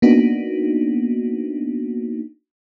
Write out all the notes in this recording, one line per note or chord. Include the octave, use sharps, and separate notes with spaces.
A#3 B3 D4 D#4 F#4